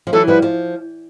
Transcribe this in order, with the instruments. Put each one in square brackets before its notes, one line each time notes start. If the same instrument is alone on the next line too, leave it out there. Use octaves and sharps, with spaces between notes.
[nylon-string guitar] F3
[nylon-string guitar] E3 F#3 [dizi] A4
[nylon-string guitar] F3 G3 [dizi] B4
[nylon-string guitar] F3